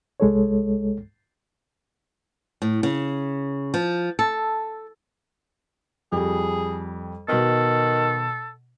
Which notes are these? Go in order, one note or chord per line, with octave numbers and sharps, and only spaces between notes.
C2 G#3 A4 C#5
A2
C#3
F3
A4
F2 G3 G#4
B2 D#3 B3 A4